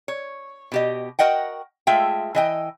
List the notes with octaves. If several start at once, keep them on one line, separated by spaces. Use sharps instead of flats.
C#5
B2 G4 D#5
F#4 A#4 D#5 F#5 G5
G#3 A3 F4 E5 G5
E3 D#5 G5